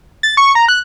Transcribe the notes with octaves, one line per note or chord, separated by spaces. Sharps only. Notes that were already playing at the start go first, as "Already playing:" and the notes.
A6
C#6
A#5
F#6